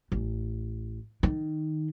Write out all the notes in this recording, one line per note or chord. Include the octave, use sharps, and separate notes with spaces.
A1
D#3